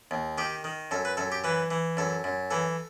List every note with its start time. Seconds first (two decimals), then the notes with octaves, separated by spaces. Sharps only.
0.11 D#2
0.38 D#3 G4
0.64 D#3
0.91 F#2 A4
1.05 B4
1.17 F#2 A4
1.32 G4
1.44 E3 B4
1.71 E3
1.97 F#2 A4
2.24 F#2
2.51 E3 A4